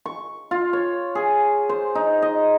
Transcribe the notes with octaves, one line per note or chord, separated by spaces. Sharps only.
C#6
F4
C#5
G#4
C5
D#4
D#5